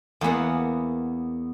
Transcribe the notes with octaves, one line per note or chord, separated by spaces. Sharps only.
E2 A#3 B3 F#5